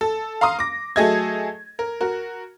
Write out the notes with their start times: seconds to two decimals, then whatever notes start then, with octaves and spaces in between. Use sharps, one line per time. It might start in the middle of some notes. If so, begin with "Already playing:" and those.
0.01 A4
0.41 F5 A#5 C6 D#6
0.59 D6 A#6
0.96 F#3 A3 G#4 A4 D#5 G#6
1.79 A#4
2.01 F#4 A#4